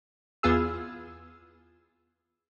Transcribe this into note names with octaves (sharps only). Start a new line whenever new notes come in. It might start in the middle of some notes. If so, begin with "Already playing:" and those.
E2 B3 F4 G#4 E6